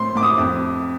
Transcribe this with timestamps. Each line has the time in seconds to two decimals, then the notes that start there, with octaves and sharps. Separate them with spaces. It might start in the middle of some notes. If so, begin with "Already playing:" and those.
Already playing: A2 C4 C6
0.15 A2 D6
0.23 D#6
0.38 F2